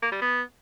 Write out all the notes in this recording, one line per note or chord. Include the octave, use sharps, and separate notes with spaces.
A#3
G3
B3